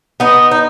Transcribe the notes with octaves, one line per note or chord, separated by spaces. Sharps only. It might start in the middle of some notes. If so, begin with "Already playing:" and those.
B3 D#4
D#4